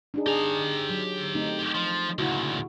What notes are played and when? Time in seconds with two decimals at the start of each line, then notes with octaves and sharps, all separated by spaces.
0.14 D4 D#4 G#4
0.27 G4 G#4 A#5
0.90 F#3
1.35 A3 C4 D#4
1.75 F3
2.19 D2 A#2 C#3 E4 F#4